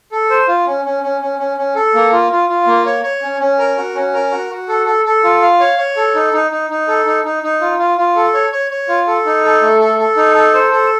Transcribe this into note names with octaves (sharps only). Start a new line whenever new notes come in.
A4
C5
F4
C#4
C#4
C#4
C#4
C#4
C#4
A4
A#3
F4
F4
F4
A#3
C#5
C#5
C#4
C#4
A#4
F#4
C#4
A#4
F#4
F#4
A4
A4
A4
F4
F5
C#5
C#5
A4
D#4
D#4
D#4
D#4
A4
D#4
D#4
D#4
F4
F4
F4
A4
C#5
C#5
C#5
F4
A4
D#4
A4
A3
A4
A4
D#4
A4
C5
A4